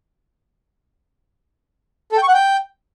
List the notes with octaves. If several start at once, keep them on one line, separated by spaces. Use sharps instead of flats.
A4
G5
C#6
F#5
G5